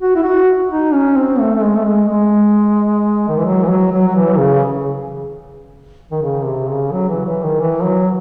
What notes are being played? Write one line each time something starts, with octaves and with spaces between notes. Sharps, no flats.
F#4
E4
F#4
D#4
C#4
C4
A3
A3
G#3
A3
G#3
G#3
D#3
E3
F#3
E3
F#3
F#3
F#3
E3
C#3
D#3
C#3
C3
C#3
F#3
E3
E3
D#3
E3
F#3